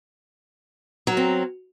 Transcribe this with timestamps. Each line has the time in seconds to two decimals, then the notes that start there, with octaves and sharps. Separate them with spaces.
1.07 F#3
1.12 A#4
1.17 C4